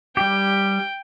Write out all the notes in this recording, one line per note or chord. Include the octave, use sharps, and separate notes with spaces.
G3 G4 G5